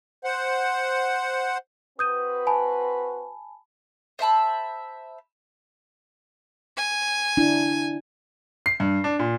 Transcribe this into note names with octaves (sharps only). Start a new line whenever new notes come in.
C5 F#5
C4 F#4 B4 D#6 G6 D#7
G#5 A5 B5
C5 E5 A5 B5
G#5
D4 E4
C7
G2
D4
A#2